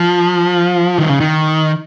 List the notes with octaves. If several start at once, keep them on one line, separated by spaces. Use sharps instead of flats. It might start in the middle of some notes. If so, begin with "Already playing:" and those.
Already playing: F3
D#3
C#3
D#3